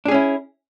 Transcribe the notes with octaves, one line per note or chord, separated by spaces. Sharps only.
C#4 D4 E4 G#4